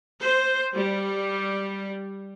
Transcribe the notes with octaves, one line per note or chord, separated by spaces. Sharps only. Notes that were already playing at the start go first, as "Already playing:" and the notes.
C5
G3